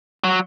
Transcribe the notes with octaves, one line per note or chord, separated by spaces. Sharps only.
F#3